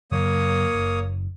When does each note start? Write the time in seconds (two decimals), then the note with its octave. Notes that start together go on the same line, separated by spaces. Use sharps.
0.12 F#2 C#3 F#3 A#3 C#5 D#6
0.73 F#1